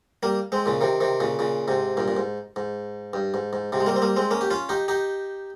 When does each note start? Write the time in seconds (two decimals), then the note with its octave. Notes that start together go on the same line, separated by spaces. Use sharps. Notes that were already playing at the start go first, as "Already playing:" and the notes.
0.23 G3 A#3
0.52 G#3 C4
0.66 A#2 C#3
0.81 C3 D#3
1.00 C3 D#3
1.20 A#2 C#3
1.39 A#2 C#3
1.68 G#2 C3
1.97 G2 A#2
2.08 A#2
2.17 G#2
2.56 G#2
3.13 G2
3.34 G#2
3.53 G#2
3.72 G#2 C3
3.80 G#3
3.86 G3 A#3
3.96 C4
4.02 G3 A#3
4.16 G#3 C4
4.31 A#3 C#4
4.41 G4
4.51 C#4 F4
4.69 D#4 G4
4.88 D#4 G4